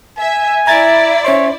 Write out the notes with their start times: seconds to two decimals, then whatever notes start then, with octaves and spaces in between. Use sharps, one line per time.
0.18 E5 G#5
0.67 E4 D5 E5 A#5 G#6 A6
1.24 C#4 C5 C#5 E5 C6